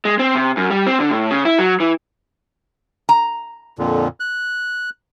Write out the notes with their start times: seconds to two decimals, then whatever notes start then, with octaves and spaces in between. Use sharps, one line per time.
0.05 G#3
0.19 C4
0.35 C3
0.57 F#2
0.70 G3
0.87 C4
1.00 D3
1.11 A2
1.30 C#3
1.45 E4
1.59 F#3
1.80 E3
3.09 A#5
3.79 F2 A#2 D3
4.20 F#6